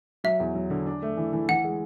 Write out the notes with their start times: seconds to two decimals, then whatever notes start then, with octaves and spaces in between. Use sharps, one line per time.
0.24 F#3 E5
0.40 E2
0.55 F#3
0.70 D3
0.86 D4
1.02 A3
1.17 E3
1.33 E3
1.49 E3 F#5
1.64 G#3